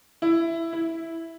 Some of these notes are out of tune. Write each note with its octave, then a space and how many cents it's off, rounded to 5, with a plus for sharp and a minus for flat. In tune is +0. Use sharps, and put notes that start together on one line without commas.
E4 +10
E4 -5